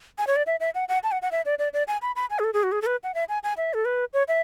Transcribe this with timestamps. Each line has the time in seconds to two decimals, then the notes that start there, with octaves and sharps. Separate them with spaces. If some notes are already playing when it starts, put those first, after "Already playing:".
0.18 G#5
0.27 C#5
0.36 D5
0.46 E5
0.60 E5
0.75 F#5
0.89 F#5
1.03 A5
1.12 F#5
1.22 F#5
1.32 E5
1.45 D5
1.59 D5
1.73 D5
1.88 G#5
2.02 B5
2.16 B5
2.30 G#5
2.39 G#4
2.44 A4
2.54 G#4
2.63 F#4
2.72 G#4
2.82 A4
2.86 B4
3.03 F#5
3.14 E5
3.29 G#5
3.43 G#5
3.57 E5
3.74 A4
3.85 B4
4.13 C#5
4.28 E5